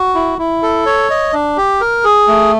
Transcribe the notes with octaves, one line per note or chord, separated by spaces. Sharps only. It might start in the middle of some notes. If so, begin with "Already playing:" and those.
Already playing: F#4
E4
E4
A4
C#5
D#5
D4
G4
A#4
G#4
A3